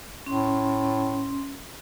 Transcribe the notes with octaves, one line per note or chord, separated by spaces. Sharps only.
A2 C#4 C6